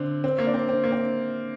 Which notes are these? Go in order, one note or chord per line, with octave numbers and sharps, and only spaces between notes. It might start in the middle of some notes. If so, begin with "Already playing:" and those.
Already playing: D3 C4
C4
A#3
D4
C4
C4
A#3
C4